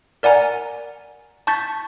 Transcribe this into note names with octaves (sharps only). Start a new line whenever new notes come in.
A#4 D5 F#5 G#5 A#5
A5 C#6 G6 A6 B6